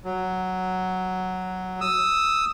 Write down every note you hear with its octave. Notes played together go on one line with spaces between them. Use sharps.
F#3
D#6 E6